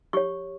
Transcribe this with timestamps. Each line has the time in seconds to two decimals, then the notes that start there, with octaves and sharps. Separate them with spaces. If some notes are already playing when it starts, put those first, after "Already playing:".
0.13 G4 C#5 C#6